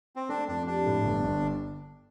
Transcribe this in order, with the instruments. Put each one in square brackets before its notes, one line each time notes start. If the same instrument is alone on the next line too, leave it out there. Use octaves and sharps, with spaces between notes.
[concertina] C4
[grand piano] A3 [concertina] D4
[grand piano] F2 [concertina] D4
[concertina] D4 [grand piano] G4
[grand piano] A2
G1
G1